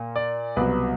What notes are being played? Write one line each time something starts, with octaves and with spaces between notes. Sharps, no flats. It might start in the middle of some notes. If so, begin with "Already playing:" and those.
Already playing: A#2
D5
C2 B2 F#3 B4